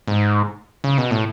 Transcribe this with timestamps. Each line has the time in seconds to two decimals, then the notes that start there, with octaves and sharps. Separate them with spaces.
0.08 G#2
0.84 C#3
0.98 B2
1.11 A2